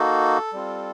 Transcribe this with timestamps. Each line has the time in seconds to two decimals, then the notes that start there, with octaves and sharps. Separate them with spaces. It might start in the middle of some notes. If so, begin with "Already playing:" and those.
Already playing: A#3 D#4 F#4 A4
0.53 G3 C4 F4